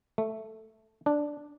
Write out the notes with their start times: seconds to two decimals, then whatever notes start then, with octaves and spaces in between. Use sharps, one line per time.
0.18 A3
1.06 D4